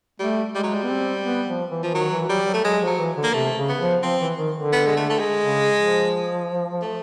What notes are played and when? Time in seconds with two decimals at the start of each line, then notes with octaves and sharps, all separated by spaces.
0.19 G3 A3
0.55 G3 G#3
0.64 F#3
0.74 G3
0.83 B3
0.90 C4
1.25 B3
1.48 F3
1.71 E3
1.83 E3 F3
1.94 D#3 F#3
2.11 E3
2.28 F#3 G3
2.46 F#3
2.54 A3
2.64 F#3 G#3
2.81 F3
2.86 F#3
2.98 E3
3.16 D3
3.24 A#3
3.33 C3 A3
3.56 C#3
3.69 B3
3.80 F3
4.03 F3 C4
4.21 E3
4.38 D#3
4.55 D3
4.73 B3
4.87 G#3
4.97 A3
5.10 A3
5.19 G#3
5.43 C#3
5.77 F3
6.82 A3